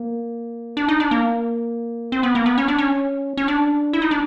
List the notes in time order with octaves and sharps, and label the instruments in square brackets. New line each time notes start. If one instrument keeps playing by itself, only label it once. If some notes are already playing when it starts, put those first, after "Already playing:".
Already playing: [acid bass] A#3
D4
D#4
D4
A#3
C4
B3
A#3
B3
C#4
D4
C#4
C#4
D4
E4
D#4
D4